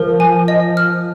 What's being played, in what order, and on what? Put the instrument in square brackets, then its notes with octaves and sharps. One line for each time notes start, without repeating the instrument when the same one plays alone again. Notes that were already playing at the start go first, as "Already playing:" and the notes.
Already playing: [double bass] F3 [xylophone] A#4
[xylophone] G#5
D#5
F6